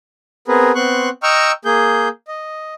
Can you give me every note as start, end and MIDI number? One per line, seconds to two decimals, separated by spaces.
0.48 0.72 59
0.48 0.72 60
0.48 0.72 68
0.48 0.72 70
0.48 0.72 71
0.75 1.09 59
0.75 1.09 60
0.75 1.09 84
0.75 1.09 85
0.75 1.09 90
1.23 1.52 75
1.23 1.52 79
1.23 1.52 82
1.23 1.52 85
1.23 1.52 88
1.23 1.52 89
1.65 2.09 58
1.65 2.09 68
1.65 2.09 91
2.28 2.74 75